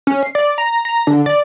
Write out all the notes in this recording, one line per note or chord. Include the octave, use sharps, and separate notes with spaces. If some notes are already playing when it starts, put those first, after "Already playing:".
C#4
C7
D5
A#5
A#5
D3
D5